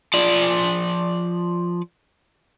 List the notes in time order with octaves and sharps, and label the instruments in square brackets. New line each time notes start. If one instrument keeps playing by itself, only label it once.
[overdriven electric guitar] F3 D5